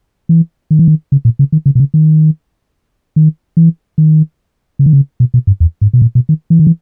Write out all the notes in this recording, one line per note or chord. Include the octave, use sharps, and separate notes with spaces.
E3
D#3
E3
D#3
C#3
A#2
C#3
D#3
C#3
B2
C#3
D#3
D#3
E3
D#3
C#3
D#3
C#3
B2
B2
G2
E2
G#2
B2
A#2
B2
D#3
E3
D#3
E3